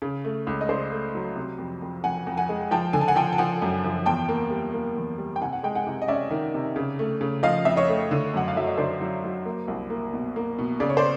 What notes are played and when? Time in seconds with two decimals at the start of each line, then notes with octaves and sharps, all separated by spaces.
0.02 C#3
0.25 A3
0.47 C#2
0.61 D#5
0.69 C#3 C5 D5
0.92 A3
1.15 F#3
1.36 C3
1.58 F2
1.82 F2
2.04 F2 F#5 G#5
2.27 F2
2.37 F#5 G#5
2.49 G#3
2.71 F3 G5 A5
2.93 D3 G#5
3.01 A5
3.08 F#5 G#5
3.16 F3 G5 A5
3.33 A5
3.38 F3 F#5 G#5
3.62 F#2
3.84 F3
4.06 E2 G5 A5
4.28 A#3
4.51 G3
4.73 A#3
4.97 E2
5.18 G3
5.36 G5
5.42 C3 F#5 G#5
5.53 F#5
5.63 G#3 G5
5.75 F#5 G#5
5.87 C3
6.02 D#5
6.08 C#4 D5 E5
6.30 D#3
6.54 C3
6.76 C#3
6.99 A3
7.21 C#3
7.43 F3 D#5 F5
7.65 F2 E5
7.77 C#5 D#5
7.88 A3
8.11 D3
8.34 F#2 F#5
8.48 F5
8.56 F#3 E5
8.67 D#5
8.78 D3 C5 D5
9.00 F#3
9.24 F#3
9.45 A#3
9.68 C2
9.90 A#3
10.13 B2
10.36 A#3
10.58 B2
10.80 C#3 D5
10.89 C#5
10.97 C5 D5